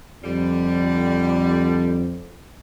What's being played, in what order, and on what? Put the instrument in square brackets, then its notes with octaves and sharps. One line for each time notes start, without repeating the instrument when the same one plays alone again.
[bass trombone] F2 [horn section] D3 G3